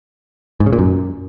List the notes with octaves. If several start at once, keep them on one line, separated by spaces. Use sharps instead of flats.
G#2
C#3
A#2
F#2